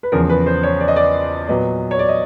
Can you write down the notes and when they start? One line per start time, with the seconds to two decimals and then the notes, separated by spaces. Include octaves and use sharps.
0.03 B4
0.12 E2 C#3 F3 A#4
0.30 B4
0.46 C5
0.63 C#5
0.80 D5
0.88 D#5
0.96 D5
1.49 A#2 F#3 B3 D#5
1.91 C#5
1.99 D5
2.09 D#5